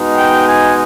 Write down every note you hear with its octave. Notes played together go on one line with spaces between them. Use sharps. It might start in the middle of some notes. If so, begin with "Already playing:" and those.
Already playing: B2 G#3 D#4
G5
G#5